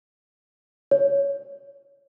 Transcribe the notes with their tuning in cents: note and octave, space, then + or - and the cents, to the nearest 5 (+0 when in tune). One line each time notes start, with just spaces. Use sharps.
C#5 +15